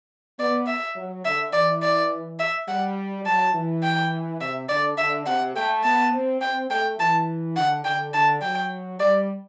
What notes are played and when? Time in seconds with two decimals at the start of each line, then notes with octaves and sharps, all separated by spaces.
0.39 B3 D5
0.67 E5
0.96 F#3
1.25 D3 E5
1.53 E3 D5
1.82 D5
2.39 E5
2.68 G3 F#5
3.25 F#3 A5
3.54 E3
3.83 G5
4.40 C3 E5
4.69 D3 D5
4.98 D3 E5
5.26 C3 F#5
5.55 A3 G5
5.84 B3 A5
6.13 C4
6.41 C4 G5
6.70 A3 G5
6.99 E3 A5
7.56 D3 F#5
7.85 D3 G5
8.13 D3 A5
8.42 F#3 G5
9.00 G3 D5